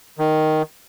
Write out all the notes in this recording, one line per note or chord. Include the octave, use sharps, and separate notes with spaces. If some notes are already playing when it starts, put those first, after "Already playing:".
D#3